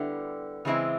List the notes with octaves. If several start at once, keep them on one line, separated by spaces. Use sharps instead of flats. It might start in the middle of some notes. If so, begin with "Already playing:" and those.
Already playing: D3 G3 B3 E4 G4
C#3 E3 G#3 C4 E4